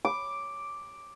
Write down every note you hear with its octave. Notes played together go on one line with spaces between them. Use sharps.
D6